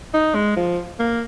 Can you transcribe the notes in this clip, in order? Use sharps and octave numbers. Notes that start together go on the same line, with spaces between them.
D#4
G#3
F3
A#3